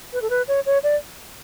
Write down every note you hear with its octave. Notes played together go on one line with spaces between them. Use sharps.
B4
A4
B4
C#5
C#5
D5